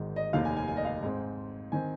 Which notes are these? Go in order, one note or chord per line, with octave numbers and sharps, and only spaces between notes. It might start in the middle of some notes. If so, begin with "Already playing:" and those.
Already playing: G#1 G#2 D#3 G#3
D#5
F1 D#2 D#3 F5
G#5
G#5
G#5
D#5
F5
G#2 G#3 C4
D#3 C4 G#5